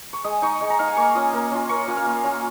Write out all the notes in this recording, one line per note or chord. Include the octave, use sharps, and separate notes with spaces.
C#6
G#3 D#6
D#4 C#6
G#3 C#6
A#5
D#4 F5
G#5
A#3 C#6
C#4 F4 D#6
A#3
C#4 F4
A#3 C#6
C#4 F4 G#5
F5
A#3
C#4 F4